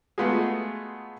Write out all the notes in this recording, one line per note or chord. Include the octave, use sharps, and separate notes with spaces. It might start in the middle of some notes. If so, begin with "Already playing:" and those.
G#3 A3 B3 F4 F#4 G#4